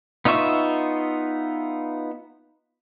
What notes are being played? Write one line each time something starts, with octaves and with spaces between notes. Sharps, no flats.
B3 D#4 F4 E5 C#6